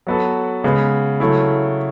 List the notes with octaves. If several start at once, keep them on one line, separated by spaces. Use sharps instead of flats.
F#3 B3 F#4 A4
C#3 G#3 B3
C#3 F#3 A3 E4